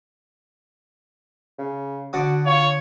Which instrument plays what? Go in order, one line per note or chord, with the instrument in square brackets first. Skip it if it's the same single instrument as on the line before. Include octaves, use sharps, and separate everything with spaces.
[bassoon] C#3
[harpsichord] D3 D5 D#6 [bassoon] F#4
[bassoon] F4 [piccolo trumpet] C#5